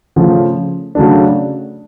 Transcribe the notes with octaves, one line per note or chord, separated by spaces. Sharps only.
C#3 F3 A3
C#3 F#3 A3 D4